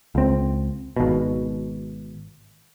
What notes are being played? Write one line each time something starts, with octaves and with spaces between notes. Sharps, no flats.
C#2 C4
G#1 B2